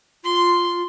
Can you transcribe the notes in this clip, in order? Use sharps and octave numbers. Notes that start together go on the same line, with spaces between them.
F4 C6